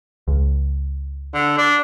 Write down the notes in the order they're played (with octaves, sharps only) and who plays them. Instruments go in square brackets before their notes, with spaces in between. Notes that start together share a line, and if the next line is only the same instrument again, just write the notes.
[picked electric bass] C#2
[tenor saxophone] D3
D4